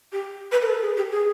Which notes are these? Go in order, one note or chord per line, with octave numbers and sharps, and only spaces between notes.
G4
B4
A#4
A4
G#4
G4
G#4